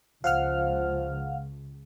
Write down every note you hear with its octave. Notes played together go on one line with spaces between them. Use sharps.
C#2 F3 F5 F#5 F6